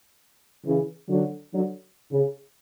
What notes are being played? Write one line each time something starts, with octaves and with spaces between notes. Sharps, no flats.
C#3 E3
D3 F#3
D3 F#3
C#3